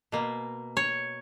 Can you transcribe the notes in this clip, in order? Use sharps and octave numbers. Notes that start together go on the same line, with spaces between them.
B2 A#3
C#5